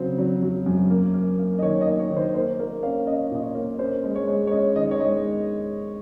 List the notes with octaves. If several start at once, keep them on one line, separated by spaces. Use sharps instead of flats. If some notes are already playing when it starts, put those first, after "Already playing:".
Already playing: C#3 F#3 C4 C5
F#3
F#3
F#2
A#3
A#3
A#3
D#5
D#3 C#5
D#5
A#3
C#5
D#3
C5
A#3 C5
A#3 A#4
C#4 F5
C#4 D#5
A#2 D#5
C#5
A#3
C#4 C5
G#3
C#5
G#3
C#5
C#4 D#5
D#3 D#5
C#5
G#3 D#5